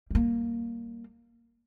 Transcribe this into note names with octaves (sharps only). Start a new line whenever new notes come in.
G3 A#3